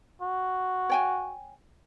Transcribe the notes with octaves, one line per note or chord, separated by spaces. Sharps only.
F#4
C#5 G5 G#5